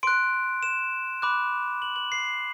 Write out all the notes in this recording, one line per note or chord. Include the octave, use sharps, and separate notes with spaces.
C6 F#6 D7
E7
B5 D6 F#6
F#7
F#7
C7